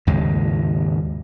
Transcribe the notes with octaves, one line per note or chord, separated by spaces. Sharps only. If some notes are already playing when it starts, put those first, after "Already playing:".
D#2 G#2 C#3 G#3